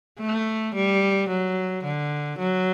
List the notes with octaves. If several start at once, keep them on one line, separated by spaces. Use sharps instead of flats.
A3
G3
F#3
D3
F#3